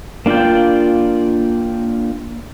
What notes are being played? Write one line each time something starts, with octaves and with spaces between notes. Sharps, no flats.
A#3 D4 F4 D5 G5